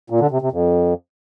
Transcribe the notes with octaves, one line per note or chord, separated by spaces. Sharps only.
A#2
D3
C3
C3
F2